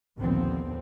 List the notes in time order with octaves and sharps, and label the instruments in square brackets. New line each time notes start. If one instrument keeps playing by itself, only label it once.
[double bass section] A#1 D#2 D3 F3 B3 C4